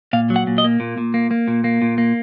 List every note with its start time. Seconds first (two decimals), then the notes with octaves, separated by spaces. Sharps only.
0.13 A#2 F5
0.30 F#3
0.36 F#5
0.47 A#2
0.58 D#5
0.64 A#3
0.80 A#2
0.98 A#2
1.14 A#3
1.31 A#3
1.48 A#2
1.64 A#3
1.82 A#2
1.98 A#3